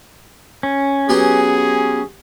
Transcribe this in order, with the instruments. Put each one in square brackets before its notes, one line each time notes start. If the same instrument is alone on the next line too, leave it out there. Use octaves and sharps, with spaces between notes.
[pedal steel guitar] C#4
[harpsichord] F#3 B3 G4 [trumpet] G#4